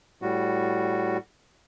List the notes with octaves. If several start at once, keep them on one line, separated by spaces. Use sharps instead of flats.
A2 G3 F#4